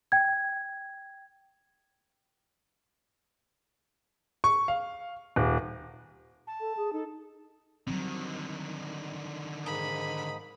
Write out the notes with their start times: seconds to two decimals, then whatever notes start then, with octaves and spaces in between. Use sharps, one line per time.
0.12 G5 G#6
4.44 C#6
4.68 F5
5.36 D#1
6.47 A5
6.60 A4
6.77 G#4
6.93 D#4 A4
7.87 D3 D#3 F#3 G3 C4
9.66 G#2 A#3 B5 D#6